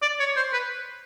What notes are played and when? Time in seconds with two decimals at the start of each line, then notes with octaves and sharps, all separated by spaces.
0.02 D5
0.20 C#5
0.36 C5
0.53 B4